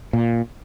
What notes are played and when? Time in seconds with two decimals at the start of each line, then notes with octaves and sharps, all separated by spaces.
0.13 A#2